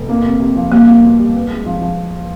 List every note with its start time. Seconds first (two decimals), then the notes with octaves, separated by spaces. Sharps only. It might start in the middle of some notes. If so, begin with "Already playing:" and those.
Already playing: F1
0.09 A#3
0.24 C3
0.40 C3
0.56 F3
0.72 G3 A#3
0.87 A#3
1.03 B2
1.19 G3
1.34 B3
1.50 G#3
1.66 F3
1.81 F3